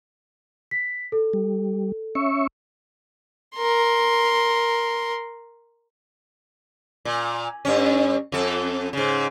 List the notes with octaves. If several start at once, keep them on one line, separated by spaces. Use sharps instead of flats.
B6
A4
G3
C#4 E5 C#6
A#4 C6
A#2
G2 C#4
F2 A4
G#2 C#3